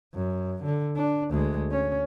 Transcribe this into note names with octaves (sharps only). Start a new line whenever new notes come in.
F#2
D3
D4
D2 G#3
C#4